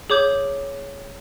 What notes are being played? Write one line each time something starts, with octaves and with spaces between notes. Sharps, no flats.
G#4 C#5 D6 G6